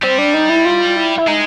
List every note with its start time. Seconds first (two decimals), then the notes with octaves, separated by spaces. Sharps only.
0.02 G3 C4
0.18 D4
0.34 D#4
0.49 E4
0.65 F4
0.96 E4
1.18 E4
1.27 G#3 D#4